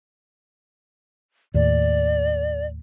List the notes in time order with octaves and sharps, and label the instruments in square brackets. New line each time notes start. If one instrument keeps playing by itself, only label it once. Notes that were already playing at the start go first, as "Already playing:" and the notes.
[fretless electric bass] D#2 A2 [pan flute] D5